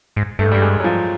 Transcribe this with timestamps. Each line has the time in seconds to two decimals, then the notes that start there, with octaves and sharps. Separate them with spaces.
0.16 G#2
0.39 G2 A3
0.47 G#2
0.52 G2 G3
0.62 G#3
0.80 F#3
0.84 F3